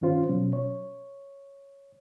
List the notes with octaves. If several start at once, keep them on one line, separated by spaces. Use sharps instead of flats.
G2 D#3 C#4 F4 C5
B2 F#3 C#4
C#5